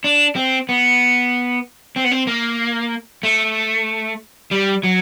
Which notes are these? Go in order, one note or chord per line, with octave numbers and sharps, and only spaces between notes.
D4
C4
B3
C4
B3
C4
A#3
A3
G3
F#3